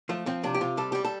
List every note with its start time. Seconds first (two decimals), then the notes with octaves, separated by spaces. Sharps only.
0.09 F3 A3
0.26 F3 C4
0.43 C3 D4
0.55 G4
0.61 C3 F4
0.77 G3 A4
0.92 G3 G4
1.05 A4